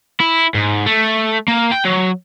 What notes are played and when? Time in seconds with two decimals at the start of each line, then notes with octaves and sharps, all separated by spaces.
0.20 E4
0.55 G#2
0.86 A3
1.48 A#3
1.72 G5
1.85 F#3